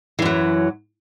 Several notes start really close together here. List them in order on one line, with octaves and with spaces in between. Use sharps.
E3 F#2 F#3